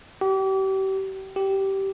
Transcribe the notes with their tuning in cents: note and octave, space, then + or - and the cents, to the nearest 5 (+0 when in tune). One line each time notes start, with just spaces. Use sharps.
G4 -35
G4 -15